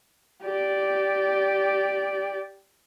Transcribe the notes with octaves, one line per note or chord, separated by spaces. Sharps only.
G4 D5